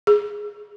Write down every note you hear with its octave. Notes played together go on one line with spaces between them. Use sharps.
G#4